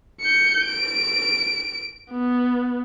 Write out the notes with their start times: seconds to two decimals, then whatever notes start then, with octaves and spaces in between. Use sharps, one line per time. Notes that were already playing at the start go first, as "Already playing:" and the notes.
0.21 G6 C#7
0.65 D7
2.11 B3